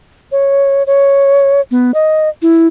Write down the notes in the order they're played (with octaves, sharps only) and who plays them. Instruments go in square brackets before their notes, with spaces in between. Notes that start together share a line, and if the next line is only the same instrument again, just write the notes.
[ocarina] C#5
C#5
B3
D#5
E4